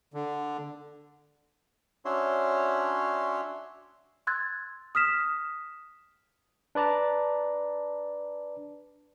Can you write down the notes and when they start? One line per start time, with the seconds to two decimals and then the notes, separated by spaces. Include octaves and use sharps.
0.14 D3
2.05 C#4 D4 F#4 C#5 E5 C6
4.27 C6 E6 F#6 G#6 A6
4.95 D#6 F6 B6 E7
6.75 D4 B4 D5 A5 A#5